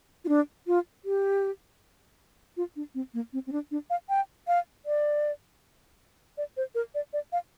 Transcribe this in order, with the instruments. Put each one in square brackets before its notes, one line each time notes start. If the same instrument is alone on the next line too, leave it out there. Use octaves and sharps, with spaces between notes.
[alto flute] F4
D4
F4
G4
F4
D4
C4
A#3
C4
C4
D4
D4
F5
G5
F5
D5
D5
C5
A#4
D5
D5
F5